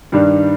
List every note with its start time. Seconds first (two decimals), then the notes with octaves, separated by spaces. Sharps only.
0.12 G2 D#3 G3 D4